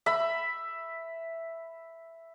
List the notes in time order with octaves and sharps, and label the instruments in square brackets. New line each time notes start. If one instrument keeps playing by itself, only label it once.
[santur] E5 B5